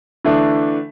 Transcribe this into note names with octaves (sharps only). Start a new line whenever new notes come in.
D3 E3 A3 D4